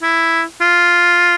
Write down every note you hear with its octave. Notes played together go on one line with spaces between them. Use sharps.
E4
F4